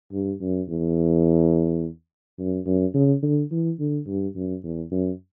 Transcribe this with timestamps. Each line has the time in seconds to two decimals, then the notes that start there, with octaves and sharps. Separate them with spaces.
0.13 G2
0.41 F#2
0.69 E2
2.39 F#2
2.66 F#2
2.94 C#3
3.23 D3
3.52 E3
3.80 D3
4.07 G2
4.36 F#2
4.64 E2
4.91 F#2